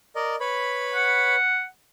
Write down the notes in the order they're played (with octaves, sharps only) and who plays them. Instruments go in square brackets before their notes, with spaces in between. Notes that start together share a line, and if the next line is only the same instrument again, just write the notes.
[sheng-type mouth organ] A#4 D5 D#5
B4 C#5 B5
[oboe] F#5